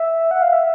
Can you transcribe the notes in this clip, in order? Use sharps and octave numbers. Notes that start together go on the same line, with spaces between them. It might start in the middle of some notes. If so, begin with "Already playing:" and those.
Already playing: E5
F#5
F5
E5